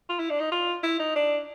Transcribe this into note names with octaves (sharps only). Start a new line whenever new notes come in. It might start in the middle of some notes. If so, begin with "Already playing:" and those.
F4
E4
D4
D#4
F4
E4
D#4
D4